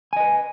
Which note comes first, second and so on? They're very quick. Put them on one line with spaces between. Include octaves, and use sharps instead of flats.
G#5 D#5 B4